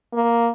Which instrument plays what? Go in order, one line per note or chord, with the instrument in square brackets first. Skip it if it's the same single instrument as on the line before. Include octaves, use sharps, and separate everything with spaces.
[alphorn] A#3